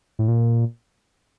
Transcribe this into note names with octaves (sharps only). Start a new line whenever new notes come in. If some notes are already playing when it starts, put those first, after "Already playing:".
A2
A#2